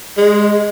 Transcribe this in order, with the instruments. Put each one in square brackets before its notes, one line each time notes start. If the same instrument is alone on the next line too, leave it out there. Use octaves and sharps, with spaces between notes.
[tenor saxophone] G#3